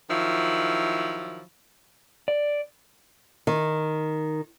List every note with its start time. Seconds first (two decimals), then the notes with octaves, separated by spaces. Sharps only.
0.10 D#3 F3 F#3 E4
2.28 D5
3.47 D#3